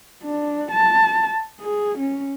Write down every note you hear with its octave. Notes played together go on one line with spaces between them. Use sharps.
D4
A5
G#4
C#4